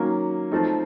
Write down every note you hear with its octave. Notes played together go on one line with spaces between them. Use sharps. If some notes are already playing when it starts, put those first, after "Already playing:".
Already playing: D#3 F#3 A#3 C#4
F3 A3 C4 D#4